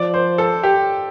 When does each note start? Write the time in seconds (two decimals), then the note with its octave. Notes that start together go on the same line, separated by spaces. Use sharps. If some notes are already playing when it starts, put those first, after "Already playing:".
Already playing: F3 D5
0.14 C5
0.38 A4
0.63 G4